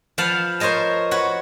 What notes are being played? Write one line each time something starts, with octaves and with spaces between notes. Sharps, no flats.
F3 B4 F5 F#5 A5
A#4 C5 C#5 D#5 A5
F#4 B4 C#5